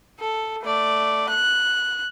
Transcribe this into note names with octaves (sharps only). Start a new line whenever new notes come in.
A4
A3 D5
F#6